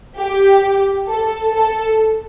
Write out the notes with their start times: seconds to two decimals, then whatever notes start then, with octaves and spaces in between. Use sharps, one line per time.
0.17 G4
1.08 A4
1.54 A4